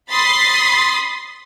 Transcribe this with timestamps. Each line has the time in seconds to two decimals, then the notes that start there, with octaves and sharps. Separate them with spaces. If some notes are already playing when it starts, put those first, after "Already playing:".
0.10 B5 C6 D#6 A6 B6 C7